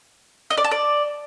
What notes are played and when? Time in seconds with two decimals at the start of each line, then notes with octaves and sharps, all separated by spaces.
0.50 D#5
0.57 D5
0.64 A5
0.71 D5